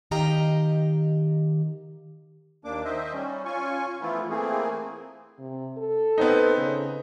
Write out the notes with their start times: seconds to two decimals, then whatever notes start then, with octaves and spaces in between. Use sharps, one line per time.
0.11 D#3 G4 D#5 F5 A#5
2.65 D#2 A#3 D4 D6
2.84 D#3 C5 D#5 E5
3.13 G3 C#4
3.45 C#4 F4 G#5 C#6
4.02 E3 F3 A3 B3 E4 F4
4.30 E3 A3 A#3 C4 G#4
5.39 C3
5.77 A4
6.18 B3 C4 D#4
6.57 C#3